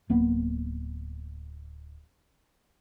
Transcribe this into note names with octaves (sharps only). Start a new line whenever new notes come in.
D1 A#3 B3